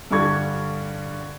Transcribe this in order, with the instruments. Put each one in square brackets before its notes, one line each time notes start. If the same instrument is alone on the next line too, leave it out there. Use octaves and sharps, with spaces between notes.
[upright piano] G2 D3 G3 C#6 G#6